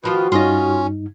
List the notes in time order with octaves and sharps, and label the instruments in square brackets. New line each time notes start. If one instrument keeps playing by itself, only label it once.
[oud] D#3 F3 F4 [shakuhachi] F#4 [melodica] B4
[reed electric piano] G2 D#4 [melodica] C#4 [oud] F4 D#5